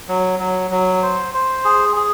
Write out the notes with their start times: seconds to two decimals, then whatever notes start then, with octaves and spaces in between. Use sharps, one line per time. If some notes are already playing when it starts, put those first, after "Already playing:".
0.08 F#3
0.40 F#3
0.71 F#3
1.02 C5
1.34 C5
1.65 G#4
1.96 G#4